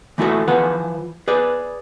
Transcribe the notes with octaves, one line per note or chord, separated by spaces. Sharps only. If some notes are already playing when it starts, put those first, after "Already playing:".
E3 A3 E4 F#4 A4 E5
E3 F3 B4 F#5
G#4 B4 D5